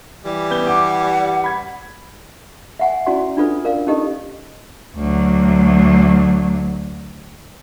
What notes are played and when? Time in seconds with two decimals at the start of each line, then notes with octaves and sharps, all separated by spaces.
0.25 E3 G3
0.51 B3 G6 G7
0.67 F#5 D6
1.44 B5 G#6
2.79 E5 F#5 G#5
3.06 C#4 E4 F#4 D5 F#5 C6
3.37 D4 F4 A4 B4
3.65 A#4 D5 F5
3.87 C#4 D#4 G4 A4 D#5
4.97 D2 F#3